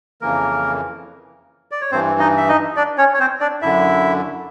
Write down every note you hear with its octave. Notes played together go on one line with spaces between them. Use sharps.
F2 C#3 E3 A#3 A#4
D5
C#5
G2 E3 C4 C5
D#4 D#5
E5
D#4 D#5
D4 D5
C#4 C#5
C#5
C4 C5
D4 D5
F#2 D3 E4 E5